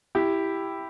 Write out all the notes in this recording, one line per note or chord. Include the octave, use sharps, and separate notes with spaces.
E4 G4